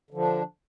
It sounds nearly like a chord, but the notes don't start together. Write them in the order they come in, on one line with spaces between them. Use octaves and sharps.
D3 F3 D4